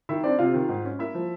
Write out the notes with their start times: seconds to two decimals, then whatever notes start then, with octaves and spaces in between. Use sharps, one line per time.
0.09 D#3 E4 E5
0.24 C4 D4 D5
0.39 C3 F4 F5
0.54 D#3
0.69 G#2
0.85 C#4
0.99 A#3 E4 E5
1.15 F3